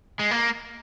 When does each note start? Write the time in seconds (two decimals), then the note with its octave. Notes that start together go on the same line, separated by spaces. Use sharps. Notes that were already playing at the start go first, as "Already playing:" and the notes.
0.19 G#3
0.31 A#3